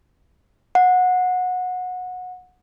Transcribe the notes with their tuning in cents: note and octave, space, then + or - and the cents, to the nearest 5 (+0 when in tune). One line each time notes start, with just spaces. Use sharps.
F#5 -20